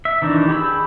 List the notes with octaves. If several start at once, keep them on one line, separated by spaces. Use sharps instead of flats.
E5
D#3 E3 D4 D#4
G4 G#4 B5 E6